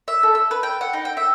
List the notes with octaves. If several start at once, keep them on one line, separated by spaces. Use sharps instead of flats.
E5
A4
E6
B4
G5
F#5
D#4
G5
E5